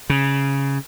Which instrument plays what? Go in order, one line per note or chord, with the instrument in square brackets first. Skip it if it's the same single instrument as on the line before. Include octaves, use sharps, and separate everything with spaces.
[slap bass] C#3